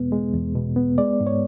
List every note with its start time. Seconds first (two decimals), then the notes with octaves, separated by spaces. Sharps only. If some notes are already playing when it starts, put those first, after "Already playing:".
Already playing: E2 B2 G#3 B3
0.12 G#3
0.34 E2
0.56 B2
0.76 B3
0.98 G#3 D5
1.21 G#2
1.27 C#5